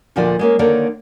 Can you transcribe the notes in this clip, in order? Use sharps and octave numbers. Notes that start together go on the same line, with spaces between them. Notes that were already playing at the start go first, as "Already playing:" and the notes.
D2 A#2 D3 F3 F4 D5
G#3 A#3 C#4
D3 D#3 A#3 A4 C#5 D5